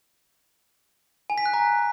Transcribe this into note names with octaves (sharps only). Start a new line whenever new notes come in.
G#5
B6
F#6
A#5